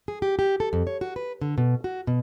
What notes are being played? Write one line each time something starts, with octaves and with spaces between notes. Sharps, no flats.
G#4
G4
G4
A4
F2
C#5
F#4
B4
D3
B2
F#4
B2